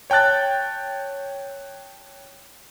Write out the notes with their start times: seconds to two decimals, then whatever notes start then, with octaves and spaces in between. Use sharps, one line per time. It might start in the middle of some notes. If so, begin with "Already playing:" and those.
0.10 C#5 G5 A5 F#6 A6